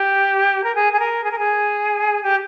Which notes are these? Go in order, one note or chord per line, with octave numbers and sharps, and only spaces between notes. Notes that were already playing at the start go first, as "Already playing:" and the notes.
Already playing: G4
A#4
G#4
G#4
A#4
G#4
A#4
G#4
G4